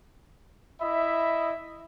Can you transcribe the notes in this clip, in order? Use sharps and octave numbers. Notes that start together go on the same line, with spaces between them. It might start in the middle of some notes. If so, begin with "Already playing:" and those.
E4 D#5 E5 B5